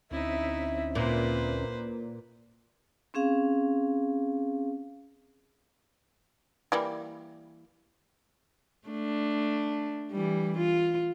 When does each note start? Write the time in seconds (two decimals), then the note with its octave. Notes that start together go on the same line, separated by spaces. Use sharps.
0.11 D2 C4 C#4 D#4 E4 E5
0.95 A#2 B4 C5
3.14 C4 C#4 G#4 F5
6.72 E3 G3 A#3
8.88 A3 D4
10.12 E3 G3
10.57 F4